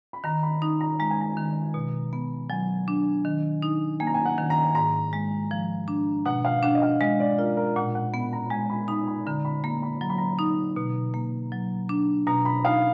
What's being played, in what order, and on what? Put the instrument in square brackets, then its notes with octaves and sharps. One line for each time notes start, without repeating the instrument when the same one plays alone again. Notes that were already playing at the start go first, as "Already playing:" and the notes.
[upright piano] B5
[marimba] D#3 [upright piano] A#5
[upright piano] B5
[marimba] D#4 [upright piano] A#5
[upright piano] A#5
[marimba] G#3 [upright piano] A#5
[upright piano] G#5
A#5
[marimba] D#3
B2
B3
[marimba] F#3 [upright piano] G#5
[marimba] D4
D#3
D#4
[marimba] A#3 [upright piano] G#5
[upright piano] A#5
G#5
F#5
[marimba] D#3
[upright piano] A#5
[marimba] G#2 [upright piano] A#5
[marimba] G#3
F3
D4
[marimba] B2 [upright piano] F#5
[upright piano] F5
[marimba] D4 [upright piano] F#5
[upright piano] D#5
F5
[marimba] G#3 [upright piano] D#5
[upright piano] D5
[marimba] F4 [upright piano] A#4
[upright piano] A#4
[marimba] A#2 [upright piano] F#5
[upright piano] F#5
[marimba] B3 [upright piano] B5
[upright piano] A#5
[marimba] G#3 [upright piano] G#5
[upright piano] B5
[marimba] D#4 [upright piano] B5
[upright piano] B5
[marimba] D3 [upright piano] A#5
[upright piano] B5
[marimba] A#3 [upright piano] A#5
[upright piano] B5
[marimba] F#3 [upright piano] A#5
[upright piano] B5
A#5
[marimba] D#4
B2
A#3
F#3
D4
[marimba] B2 [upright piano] A#5
[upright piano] B5
[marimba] D#4 [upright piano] F5